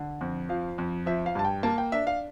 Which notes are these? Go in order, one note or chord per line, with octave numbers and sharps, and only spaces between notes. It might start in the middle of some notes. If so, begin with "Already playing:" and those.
Already playing: D3
F2
F3 F5
F2
F3 E5
F5
G2 A5
G5
A#3 A5
G5
D4 E5
F5